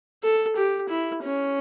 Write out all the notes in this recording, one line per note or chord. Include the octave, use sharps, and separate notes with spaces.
A4
G4
E4
C#4